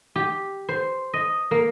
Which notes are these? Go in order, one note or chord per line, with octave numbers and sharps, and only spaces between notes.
G4
C5
D#5
A#3